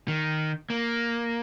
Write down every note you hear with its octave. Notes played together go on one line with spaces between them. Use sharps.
D#3
A#3